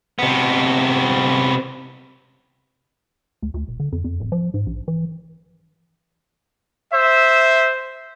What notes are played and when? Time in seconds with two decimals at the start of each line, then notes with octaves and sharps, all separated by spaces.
0.19 C3 B3
3.42 D2
3.54 D2
3.68 E1
3.80 D3
3.92 F2
4.04 F2
4.20 D1
4.32 F3
4.54 G#2
4.66 A#1
4.88 E3
6.93 C5 E5